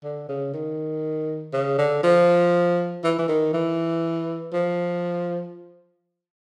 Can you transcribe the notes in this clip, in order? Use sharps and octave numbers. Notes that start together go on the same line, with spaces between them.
D3
C#3
D#3
C#3
D3
F3
E3
E3
D#3
E3
F3